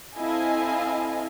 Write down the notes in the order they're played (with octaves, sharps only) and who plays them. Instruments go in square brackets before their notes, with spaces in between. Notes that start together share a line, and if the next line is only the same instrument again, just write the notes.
[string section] C4 E4 A4 D#5 F5 G#5